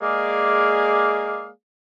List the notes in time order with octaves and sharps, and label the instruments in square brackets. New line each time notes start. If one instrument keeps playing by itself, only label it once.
[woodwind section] G#3 A#3 G#4 D5 F5